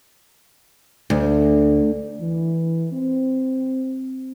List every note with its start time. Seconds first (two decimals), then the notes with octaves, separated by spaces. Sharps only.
1.10 D2
2.20 E3
2.93 C4